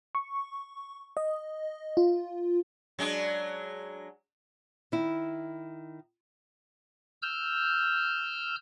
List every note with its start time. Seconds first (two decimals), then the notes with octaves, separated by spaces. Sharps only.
0.15 C#6
1.17 D#5
1.97 F4
2.99 F#3 G#3 D4
4.92 D#3 E4
7.22 E6 F6 G6